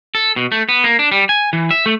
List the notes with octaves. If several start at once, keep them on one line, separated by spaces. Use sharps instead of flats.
A4
B2
A3
B3
A#3
D4
G3
G#5
E3
E5
A3